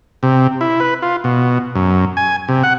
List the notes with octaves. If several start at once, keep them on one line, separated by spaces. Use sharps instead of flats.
C3
E4
B4
F4
B2
F#2
G#5
C3
F#5